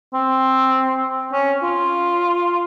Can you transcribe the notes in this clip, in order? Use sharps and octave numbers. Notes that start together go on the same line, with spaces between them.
C4
C#4
F4